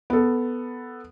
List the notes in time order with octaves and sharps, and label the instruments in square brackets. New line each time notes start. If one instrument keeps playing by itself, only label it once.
[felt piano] B3 A4